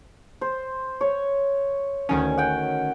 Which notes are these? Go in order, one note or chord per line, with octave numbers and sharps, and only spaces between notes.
C5
C#5
D2 D#3 C#4 G#5
F#5 G5